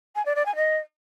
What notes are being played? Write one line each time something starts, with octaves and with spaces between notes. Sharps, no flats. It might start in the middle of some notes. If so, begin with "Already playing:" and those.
G#5
D5
D5
G#5
D#5